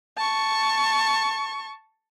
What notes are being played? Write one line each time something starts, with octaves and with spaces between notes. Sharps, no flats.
A5 C#6